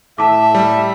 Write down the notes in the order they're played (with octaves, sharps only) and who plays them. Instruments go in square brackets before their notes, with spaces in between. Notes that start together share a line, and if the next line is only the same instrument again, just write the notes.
[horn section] A2 E5 [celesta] A5 D6
[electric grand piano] G3